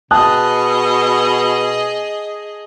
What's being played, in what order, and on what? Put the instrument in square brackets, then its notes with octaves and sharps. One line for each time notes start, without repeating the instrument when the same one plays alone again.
[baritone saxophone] B2 [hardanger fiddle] G#4 D#5 [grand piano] A5 D#6 F#6